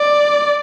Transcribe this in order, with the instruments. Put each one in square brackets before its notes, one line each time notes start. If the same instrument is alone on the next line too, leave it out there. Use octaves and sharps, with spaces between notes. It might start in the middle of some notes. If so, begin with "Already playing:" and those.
Already playing: [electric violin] D5